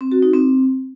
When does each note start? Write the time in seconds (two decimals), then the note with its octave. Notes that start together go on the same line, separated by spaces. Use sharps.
0.01 C4
0.12 F#4
0.22 D#4
0.33 C4